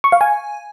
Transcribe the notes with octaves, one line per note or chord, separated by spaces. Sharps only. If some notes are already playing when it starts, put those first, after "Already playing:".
C#6
F5
G#5